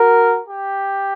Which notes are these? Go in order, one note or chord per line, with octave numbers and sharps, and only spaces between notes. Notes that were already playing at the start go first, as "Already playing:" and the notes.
Already playing: F#4 A#4
G4